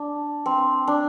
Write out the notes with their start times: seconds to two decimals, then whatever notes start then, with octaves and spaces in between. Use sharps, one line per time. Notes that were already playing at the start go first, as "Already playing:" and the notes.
Already playing: D4
0.46 C4
0.87 D4